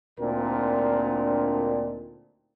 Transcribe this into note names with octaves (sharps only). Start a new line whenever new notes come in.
D2 A#2 C4 D4 D#4 A#4